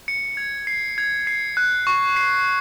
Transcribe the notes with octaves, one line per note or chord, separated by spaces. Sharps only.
C#7
G#6
C7
G#6
C7
F#6
C#6
C7